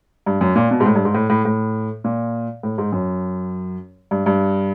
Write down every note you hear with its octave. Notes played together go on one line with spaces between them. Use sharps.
G2
F#2
A#2
B2
G#2
A2
G2
G#2
A2
A2
A2
A#2
A2
G#2
F#2
G2
G2